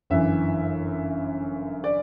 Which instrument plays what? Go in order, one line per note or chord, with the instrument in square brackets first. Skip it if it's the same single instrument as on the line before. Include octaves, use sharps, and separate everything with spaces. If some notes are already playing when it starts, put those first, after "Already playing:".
[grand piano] G1 F#2 E3 E5
D5